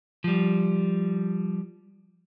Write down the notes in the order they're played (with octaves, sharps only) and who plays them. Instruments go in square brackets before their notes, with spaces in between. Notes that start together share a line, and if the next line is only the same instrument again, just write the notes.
[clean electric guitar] F3 G3